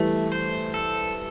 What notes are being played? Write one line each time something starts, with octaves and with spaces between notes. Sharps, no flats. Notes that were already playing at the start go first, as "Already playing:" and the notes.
Already playing: E3 G3 A3
C5
A4